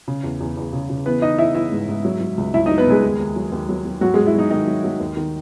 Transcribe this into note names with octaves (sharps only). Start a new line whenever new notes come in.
C#3
E2
E2
E2
C#3
C#3
E3 B3 B4
E3 D#4 D#5
E3 E4 E5
E3 E4 E5
G#2
G#2
F#3
F#3
C#2
C#2 E4 E5
F#3 D#4 D#5
B3 B4
C#2 G#3 G#4
D#2
D#2
F#3
D#2
F#3
F#3
G#2 F#3 F#4
G#2 G#3 G#4
E4
F#3 D#4
D#3 D#4
F#3
F#3
D#2
D#3